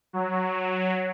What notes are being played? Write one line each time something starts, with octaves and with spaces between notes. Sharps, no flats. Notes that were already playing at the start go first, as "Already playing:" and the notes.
F#3